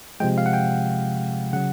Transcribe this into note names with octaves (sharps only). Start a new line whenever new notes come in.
C3 F3 G#3 G5
F5
F#5
G5
C#3 F#3 F#5